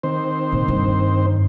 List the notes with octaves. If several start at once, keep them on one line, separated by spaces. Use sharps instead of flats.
D#3 C4 C5
A#2
G2